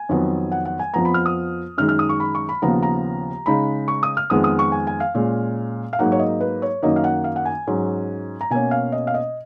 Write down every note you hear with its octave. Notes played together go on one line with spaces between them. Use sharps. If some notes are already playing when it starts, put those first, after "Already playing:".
Already playing: G#5
F2 D#3 F#3 B3
F#5
F#5
G#5
F2 F3 B3 A#5
B5
F6
D#6
F#2 D#3 G#3 D#4 F6
F6
D#6
C#6
B5
C#6
B5
D#2 C#3 F3 B3 A#5
A#5
C#3 G#3 D#4 B5
C#6
D#6
F6
F2 D#3 G#3 B3 D#6
D#6
C#6
G#5
G#5
F5
A#2 G#3 C#4
F5
G#2 F#3 A#3 D#4 F#5
C#5
D#5
B4
C#5
F#2 D#3 F#3 A#3 D#4 D#5
F5
F#5
F5
F#5
G#5
G#2 F#3 C#4
A#5
B2 A#3 C#4 G#5
F5
D#5
F5
D#5